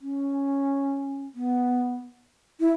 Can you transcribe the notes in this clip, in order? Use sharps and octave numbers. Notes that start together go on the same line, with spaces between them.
C#4
B3
E4